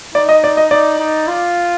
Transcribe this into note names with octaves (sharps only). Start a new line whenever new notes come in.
D#4 D5
D#5
D5
D#5
D#4 D5
D#4
F4